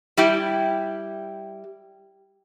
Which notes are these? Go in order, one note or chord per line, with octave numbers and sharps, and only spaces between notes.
G3 E4 G4